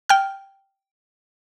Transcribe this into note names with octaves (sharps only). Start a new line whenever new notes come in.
G5 F6